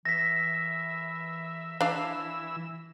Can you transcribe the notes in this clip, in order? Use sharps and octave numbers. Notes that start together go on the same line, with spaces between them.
E3 E5 A#6 B6
E3 D4 F5 E6